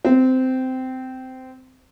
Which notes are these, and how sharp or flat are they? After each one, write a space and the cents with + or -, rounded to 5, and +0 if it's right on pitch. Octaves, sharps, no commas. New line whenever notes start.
C4 -15